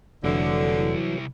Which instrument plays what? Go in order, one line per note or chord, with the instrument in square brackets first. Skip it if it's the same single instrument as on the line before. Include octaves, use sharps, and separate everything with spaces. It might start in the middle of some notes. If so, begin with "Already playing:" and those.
[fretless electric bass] F1 [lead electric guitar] C2 E4 [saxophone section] D3 [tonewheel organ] E3 F#3